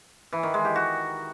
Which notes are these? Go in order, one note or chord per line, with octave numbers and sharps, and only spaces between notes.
E3
D#3
G#3
G4
F#4